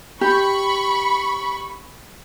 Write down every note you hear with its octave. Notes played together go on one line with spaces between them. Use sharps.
G4 B5 C#6